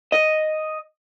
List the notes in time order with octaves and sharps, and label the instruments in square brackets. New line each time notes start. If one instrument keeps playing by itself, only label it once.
[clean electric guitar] D#5